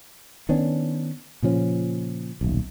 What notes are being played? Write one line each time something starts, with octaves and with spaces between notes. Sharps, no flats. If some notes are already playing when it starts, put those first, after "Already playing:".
D#3 B3 C#4 D4
A#2 C#3 F3 C#4
D#1 B1